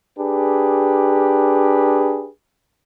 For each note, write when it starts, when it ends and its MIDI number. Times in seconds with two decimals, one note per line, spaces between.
0.18 2.28 62
0.18 2.28 67
0.18 2.28 68
0.18 2.28 71